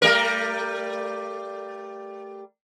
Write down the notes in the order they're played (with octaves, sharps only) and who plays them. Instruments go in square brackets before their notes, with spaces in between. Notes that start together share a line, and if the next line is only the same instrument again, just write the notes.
[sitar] G3 A3 A#4